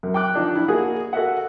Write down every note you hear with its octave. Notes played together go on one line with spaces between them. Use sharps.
F#2
G5 D6 F#6
D3 F3 D4 D#4
E4
A#3 F#4 G#4
F#4 A4 A#4 D#5 E5 F#5